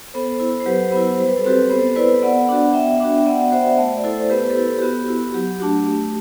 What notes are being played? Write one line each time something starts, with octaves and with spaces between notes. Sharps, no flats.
B3 A4 C5
E4
C5
F#3 G4 B4
B3 E4
G3 C5
B4
A4
C4 F#4 G4 B4
B3 A4 C5
E4 B4 D5
B3 D5 F#5
D4 F#4
B3 E5 G5
D4 F#4
G5
B3 D5 F#5
F#4 C5 E5
A3
D5
E4 A4 C5
C5
B3 G4 B4
A4
E4 G4
G4
B3 F#4
E4
F#3 G4
A3 D4 F#4
A3